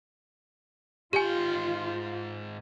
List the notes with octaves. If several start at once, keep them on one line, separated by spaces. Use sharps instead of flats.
G#2 F4 G4 G5 G#5